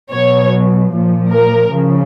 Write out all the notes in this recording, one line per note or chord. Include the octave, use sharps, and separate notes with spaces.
B2 F#3 C#5
A#2 F3
A#4
C#3 F3